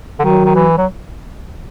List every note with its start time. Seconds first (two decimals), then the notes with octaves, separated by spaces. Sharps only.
0.19 D3
0.24 D#3 F#3
0.45 D#3
0.55 E3
0.78 F#3